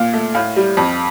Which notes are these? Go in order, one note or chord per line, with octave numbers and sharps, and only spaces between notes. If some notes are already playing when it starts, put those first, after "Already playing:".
Already playing: A#2 F5
A3
A2 F5
G3
F2